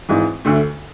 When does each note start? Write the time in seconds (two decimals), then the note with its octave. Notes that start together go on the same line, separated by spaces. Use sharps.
0.09 G#1 G#2 E3
0.45 D2 D3 A3